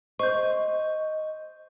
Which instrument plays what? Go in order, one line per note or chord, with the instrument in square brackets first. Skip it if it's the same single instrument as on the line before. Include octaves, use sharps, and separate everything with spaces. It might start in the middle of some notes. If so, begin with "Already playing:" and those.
[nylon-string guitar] C5 [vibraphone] D#5 [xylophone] C#6 G6